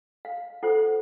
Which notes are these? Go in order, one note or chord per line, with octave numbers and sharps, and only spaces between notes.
F5
F4 A4 C5 F#5